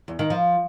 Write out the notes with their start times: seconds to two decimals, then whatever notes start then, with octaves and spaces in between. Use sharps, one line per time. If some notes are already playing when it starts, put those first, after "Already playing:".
0.08 E2
0.19 D#3
0.30 F3